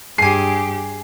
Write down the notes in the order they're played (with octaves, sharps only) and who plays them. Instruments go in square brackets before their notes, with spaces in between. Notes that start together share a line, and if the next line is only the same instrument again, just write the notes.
[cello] G2 G4 [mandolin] G#4 G#5 [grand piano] C7